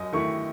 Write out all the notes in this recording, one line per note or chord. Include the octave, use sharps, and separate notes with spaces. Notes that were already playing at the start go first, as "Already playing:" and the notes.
Already playing: F#2 D#5
D#3 A3 E4 C#6